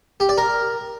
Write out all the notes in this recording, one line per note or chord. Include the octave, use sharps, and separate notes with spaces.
G4
D5
A#4